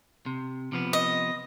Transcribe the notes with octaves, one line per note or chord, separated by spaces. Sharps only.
C3
C3 F3 B3
D#5